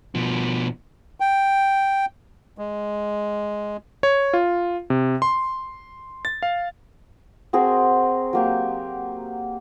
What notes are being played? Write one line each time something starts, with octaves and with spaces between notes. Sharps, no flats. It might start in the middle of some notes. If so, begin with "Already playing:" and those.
B2 F3
G5
G#3
C#5
F4
C3
C6
A6
F5
C4 F#4 G#4 A#4
F#3 A#3 G4